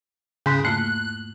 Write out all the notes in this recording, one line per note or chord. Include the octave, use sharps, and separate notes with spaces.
E2 G#2 C#3 F#6
A3 A#3 F4 F#6